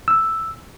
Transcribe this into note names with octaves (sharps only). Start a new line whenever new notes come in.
E6